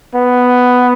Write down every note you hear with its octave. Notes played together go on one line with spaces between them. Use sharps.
B3